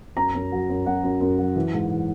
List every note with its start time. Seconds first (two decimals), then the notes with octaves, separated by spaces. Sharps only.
0.16 F#2 A#5
0.35 F#2
0.52 F#3
0.69 F#2
0.86 F#2 F#5
1.03 F#2
1.21 F#2
1.39 F#3
1.56 E3
1.74 G#2
1.91 E3